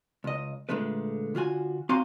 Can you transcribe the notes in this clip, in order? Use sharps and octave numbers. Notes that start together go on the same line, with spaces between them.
C#2 D#5
A#2 D3 G#3 A3 B4
D3 F4 F#4 G#5
C4 F#4 F5 G#5 A#5 C6